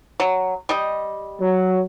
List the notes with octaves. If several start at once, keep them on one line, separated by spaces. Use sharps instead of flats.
F#3
G3 G4 D#5
F#3